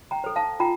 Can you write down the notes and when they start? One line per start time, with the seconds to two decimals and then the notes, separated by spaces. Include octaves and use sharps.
0.11 G5 A#5
0.24 A4 C5
0.36 F5 A5
0.60 F4 G5 A#5